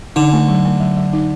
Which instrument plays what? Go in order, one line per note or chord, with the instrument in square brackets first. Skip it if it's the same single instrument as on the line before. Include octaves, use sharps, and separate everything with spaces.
[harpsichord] D3 [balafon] D#4
[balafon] A3
F#3
A3
F#3
F#3
D#4